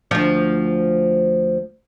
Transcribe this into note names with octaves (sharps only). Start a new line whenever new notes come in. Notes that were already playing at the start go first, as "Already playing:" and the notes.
D2 F3